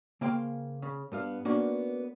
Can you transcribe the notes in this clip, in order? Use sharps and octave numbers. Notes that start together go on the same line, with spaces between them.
C#3 A#3 C5 F5 G5 C6
C#3
G2 B3 F5
A#3 B3 C#4 D4 F#4